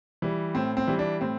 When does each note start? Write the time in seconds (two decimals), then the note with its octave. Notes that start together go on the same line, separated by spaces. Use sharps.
0.22 E3 G3
0.55 A2 C4
0.77 C4
0.87 E3 G3
0.99 D4
1.21 A2 C4